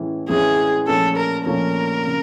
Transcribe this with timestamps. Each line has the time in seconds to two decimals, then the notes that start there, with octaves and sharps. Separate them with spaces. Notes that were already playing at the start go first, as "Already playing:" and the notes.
Already playing: A2 E3 G#3 C#4 E4
0.29 A2 E3 G#3 C#4 E4 G#4
0.88 A#2 F3 A3 C#4 A4
1.17 A#4
1.46 A#2 F3 A3 C#4 A#4
2.07 C#3